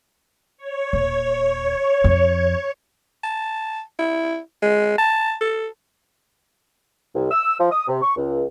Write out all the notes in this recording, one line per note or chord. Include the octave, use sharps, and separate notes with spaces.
C#5
D#1
F2
A5
E4
G#3
A5
A4
C2
E6
F3
D#6
C3
C#6
C#2